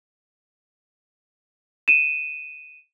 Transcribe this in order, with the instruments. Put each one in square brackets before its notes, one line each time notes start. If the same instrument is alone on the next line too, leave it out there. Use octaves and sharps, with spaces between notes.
[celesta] D#7 E7